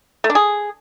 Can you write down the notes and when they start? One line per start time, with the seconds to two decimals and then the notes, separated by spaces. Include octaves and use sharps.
0.24 A3
0.30 D4
0.35 G#4